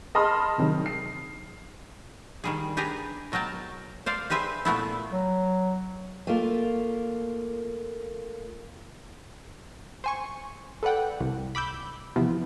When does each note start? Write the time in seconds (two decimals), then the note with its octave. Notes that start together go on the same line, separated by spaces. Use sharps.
0.15 D#5 A5 B5 C6 D#6 F6
0.58 C3 D#3 F#3
0.86 C7
2.44 D#3 G3 G#4
2.77 D4 G4 G#4 B4 G#5 A#5
3.32 B2 F#3 A#4 G5 A5
4.06 C5 D5 F5
4.30 G4 G#4 B4 C5 E5
4.65 A#2 A3 B3 E4
5.12 F#3
6.27 A3 A#3 F4
10.04 C5 G#5 C#6
10.83 A4 B4 D5 F#5 G5
11.20 C2
11.55 B5 D6 E6 G6
12.16 E2 C3 F3 B3 E4